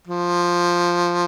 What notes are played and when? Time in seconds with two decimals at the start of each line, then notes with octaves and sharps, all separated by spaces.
0.07 F3